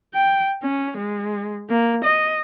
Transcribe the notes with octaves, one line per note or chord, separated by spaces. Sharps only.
G5
C#4
G#3
A#3
D#5